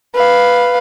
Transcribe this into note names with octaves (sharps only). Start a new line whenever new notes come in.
B4 F5